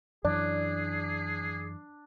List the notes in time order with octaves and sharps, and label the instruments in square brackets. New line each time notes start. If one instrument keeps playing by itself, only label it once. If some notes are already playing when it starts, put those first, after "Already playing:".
[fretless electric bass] F#2 E3 [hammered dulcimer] D4 [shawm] G#4 [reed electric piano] D5